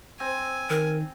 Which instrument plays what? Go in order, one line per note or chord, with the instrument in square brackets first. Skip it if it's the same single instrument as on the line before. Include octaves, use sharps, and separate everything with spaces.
[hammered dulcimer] C4 [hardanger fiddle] G#5
[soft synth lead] D#3 [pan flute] A#4